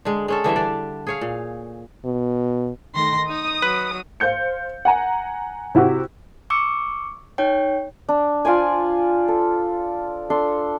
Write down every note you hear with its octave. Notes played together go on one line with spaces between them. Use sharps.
D3 G#3
G#3 C#4 A4
D3 E3 G3 E5
D4 D5
G#4 C#5 F5
A#2
B2
D#3 A3 C6 A#6
D#4 D#6
F#3 B4
C5 F5 G6 C#7
F#5 G#5 A#5
C3 E4 F#4 G4
C#6 D6 E6 C#7
D#4 C#5 G5
D4
F4 C5 D5 G#5
A4
D4 A4 C6